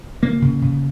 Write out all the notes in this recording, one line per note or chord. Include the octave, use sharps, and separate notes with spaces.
C#3 A#3
C#3
C#3